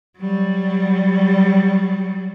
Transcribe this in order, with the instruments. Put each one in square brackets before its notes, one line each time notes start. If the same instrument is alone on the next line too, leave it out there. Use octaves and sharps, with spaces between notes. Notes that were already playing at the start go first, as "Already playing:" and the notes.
[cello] F#3 G3